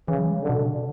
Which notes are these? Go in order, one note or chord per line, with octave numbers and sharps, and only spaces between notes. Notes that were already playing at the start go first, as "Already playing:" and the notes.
C#3 E3
F#3
G#3
F#3
D3
B2
C#3
D3